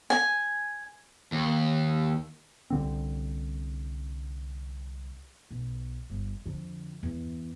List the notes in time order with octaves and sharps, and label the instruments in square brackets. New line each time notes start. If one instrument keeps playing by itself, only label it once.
[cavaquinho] G#5
[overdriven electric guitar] D#2
[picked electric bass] C2 D3 C4
[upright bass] B1
G1
F2 D3
E2